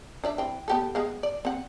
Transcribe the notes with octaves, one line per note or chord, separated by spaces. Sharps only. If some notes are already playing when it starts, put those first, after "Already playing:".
D4 D5 E5
E3 C4
B3 G4 A4
G#3 B3 F5
D5
C4 F#5